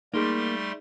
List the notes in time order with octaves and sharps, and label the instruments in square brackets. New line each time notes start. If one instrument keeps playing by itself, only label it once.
[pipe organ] G3 A3 C6 [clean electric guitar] A#3 [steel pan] D#4 G#4